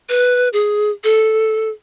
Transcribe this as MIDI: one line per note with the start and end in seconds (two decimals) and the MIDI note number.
0.09 0.49 71
0.53 0.90 68
1.04 1.69 69